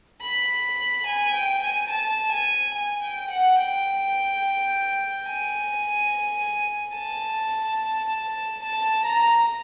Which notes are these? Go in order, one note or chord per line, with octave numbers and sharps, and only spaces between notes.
B5
G#5
G5
G#5
A5
G#5
G#5
G5
F#5
G5
G#5
A5
A5
A#5